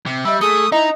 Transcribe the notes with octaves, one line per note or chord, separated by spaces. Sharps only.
C3
G3 D#5 E5 E6
A3 G#4 D#6
D#4 E4 D#5 A#5